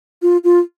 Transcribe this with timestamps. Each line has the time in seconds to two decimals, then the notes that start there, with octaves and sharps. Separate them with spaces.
0.22 F4
0.44 F4